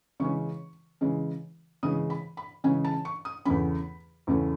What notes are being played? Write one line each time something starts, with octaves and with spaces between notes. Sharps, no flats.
C#3 E3 G#3 C#4 C#6
C#3 E3 G#3 C#4
C#3 E3 G#3 C#4 D#6
B5
B5
C#3 E3 G#3 C#4 G#5
A5
C#6
D#6
E2 C#3 E3 A3 C#4 B5
E2 C#3 E3 A3 C#4